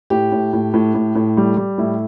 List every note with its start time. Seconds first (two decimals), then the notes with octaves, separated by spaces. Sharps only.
0.10 A2 G4
0.32 A2
0.53 A2
0.74 A2
0.94 A2
1.15 A2
1.37 G3
1.57 G3
1.78 A2 E4